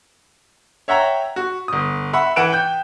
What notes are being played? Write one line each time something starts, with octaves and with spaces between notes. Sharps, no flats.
C#5 E5 F#5 G5 A#5
F#4
G1 D#6
E5 F#5 B5
E3 B4 F#5 F#6 D7 E7
G5 G6